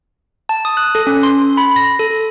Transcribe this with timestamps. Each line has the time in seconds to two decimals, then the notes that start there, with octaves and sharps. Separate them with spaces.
0.49 A5
0.65 D#6
0.77 F#6
0.95 A4
1.07 C#4
1.23 C6
1.57 B5
1.76 A#6
1.99 A4